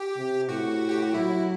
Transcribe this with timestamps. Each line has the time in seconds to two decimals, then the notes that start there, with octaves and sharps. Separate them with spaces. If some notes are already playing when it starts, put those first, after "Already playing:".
Already playing: G4
0.16 C3
0.49 A2 F#4
0.89 G4
1.01 F#4
1.14 F#3 E4